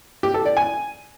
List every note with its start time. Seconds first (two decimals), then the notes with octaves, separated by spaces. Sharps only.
0.23 G4
0.34 A4
0.45 D5
0.57 G#5